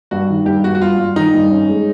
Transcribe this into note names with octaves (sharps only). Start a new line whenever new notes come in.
G2 F#4
D#3
G2 G4
G2 F#4
F#4
G2 F4
G2
D#3 D#4
G2
C#4
G#3